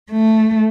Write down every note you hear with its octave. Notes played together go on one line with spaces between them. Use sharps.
A3